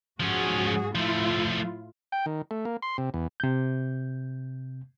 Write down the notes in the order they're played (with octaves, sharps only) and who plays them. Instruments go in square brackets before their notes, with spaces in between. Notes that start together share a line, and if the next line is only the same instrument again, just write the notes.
[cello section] G#2 F#4 G#4 [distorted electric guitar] F3 C#4
[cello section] A2 E4 F4 [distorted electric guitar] F3 A3
[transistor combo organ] G5
D#3
A3
A#3
C6
C3
E2
[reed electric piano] C3 G6